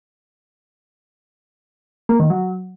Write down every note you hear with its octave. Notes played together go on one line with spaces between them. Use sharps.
A#3
D#3
F#3